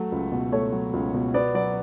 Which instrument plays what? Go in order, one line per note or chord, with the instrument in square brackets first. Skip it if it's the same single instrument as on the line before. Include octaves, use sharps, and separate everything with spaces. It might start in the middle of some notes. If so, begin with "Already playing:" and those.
Already playing: [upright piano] F#3 A3
C#2
B2
A3 C#5
F#3
C#2
B2
B3 D5
F#3 D5